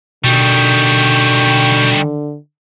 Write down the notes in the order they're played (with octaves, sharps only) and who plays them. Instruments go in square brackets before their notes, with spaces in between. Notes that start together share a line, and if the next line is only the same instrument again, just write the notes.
[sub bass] B2 [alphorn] D3 [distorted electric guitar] D#3 G3 [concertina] G5 C#6